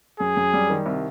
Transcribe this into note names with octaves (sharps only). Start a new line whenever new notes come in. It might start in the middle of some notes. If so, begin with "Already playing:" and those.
F#2 G#4
F#2
G3
D#3
C2